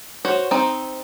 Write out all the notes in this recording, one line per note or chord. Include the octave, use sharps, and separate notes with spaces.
F#4 C5 C#5
C4 D#4